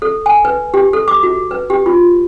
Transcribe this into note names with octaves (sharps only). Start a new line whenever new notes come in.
A4
G#5
B4
G4
A4
D6
F#4
B4
G4
F4